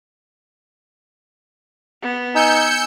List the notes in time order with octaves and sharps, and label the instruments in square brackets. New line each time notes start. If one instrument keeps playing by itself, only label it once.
[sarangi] B3
[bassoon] D#4 [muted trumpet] G#5 [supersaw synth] E6 G6 C#7